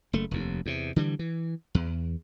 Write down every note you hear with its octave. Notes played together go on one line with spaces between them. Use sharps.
F#1 A3
F1 D#2
E2 C3
D3 E3 G3
E3
E2